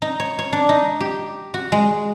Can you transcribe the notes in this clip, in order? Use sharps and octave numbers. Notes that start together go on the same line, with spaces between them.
D#4
C#5
C#5
D4
D#4
G4
F#4
G#3